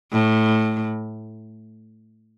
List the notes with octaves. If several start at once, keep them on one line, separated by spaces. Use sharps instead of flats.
A2